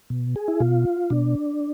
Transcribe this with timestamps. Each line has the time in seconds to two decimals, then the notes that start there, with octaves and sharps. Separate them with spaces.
0.10 B2
0.36 G#4
0.48 E4
0.60 B2 F4
1.10 B2 D4